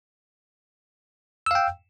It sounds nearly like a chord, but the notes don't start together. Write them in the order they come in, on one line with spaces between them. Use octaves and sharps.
E6 F5 G5